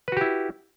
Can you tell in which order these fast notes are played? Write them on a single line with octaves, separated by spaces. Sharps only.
B4 F#4 G4 E4